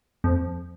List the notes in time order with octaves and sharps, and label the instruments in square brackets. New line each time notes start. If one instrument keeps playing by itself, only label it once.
[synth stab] F2